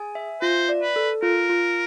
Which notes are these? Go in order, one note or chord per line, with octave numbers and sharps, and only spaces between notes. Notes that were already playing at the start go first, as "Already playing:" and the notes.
Already playing: G#4 G#5
E5
F4 C5
D5
B4
A4
F4 A#4
F4